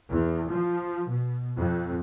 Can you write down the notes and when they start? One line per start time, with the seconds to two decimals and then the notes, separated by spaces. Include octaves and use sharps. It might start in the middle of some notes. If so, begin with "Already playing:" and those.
0.10 E2
0.50 F3
1.09 B2
1.59 F2